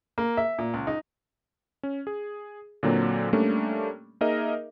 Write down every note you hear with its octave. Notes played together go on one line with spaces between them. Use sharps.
A#3
E5
A#2
C#2
D#4
C#4
G#4
A#2 D3 F#3 A#3 C4
G3 A3 A#3 C#4 D4
A#3 D#4 G#4 A#4 D#5 E5